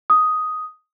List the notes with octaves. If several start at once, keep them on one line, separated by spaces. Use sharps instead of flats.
D#6